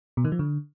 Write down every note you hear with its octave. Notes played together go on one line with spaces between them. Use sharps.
B2
D#3
F3
D3